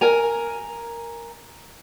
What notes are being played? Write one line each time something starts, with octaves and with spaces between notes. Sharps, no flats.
A#4 G#5 A#5